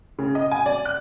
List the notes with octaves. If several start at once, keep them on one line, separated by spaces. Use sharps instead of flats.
C#3
D#5
G#5
D5
F#6